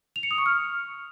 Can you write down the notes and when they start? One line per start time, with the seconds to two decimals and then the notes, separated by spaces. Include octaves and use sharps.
0.16 F7
0.23 C#7
0.31 D#6
0.38 C#6
0.46 F6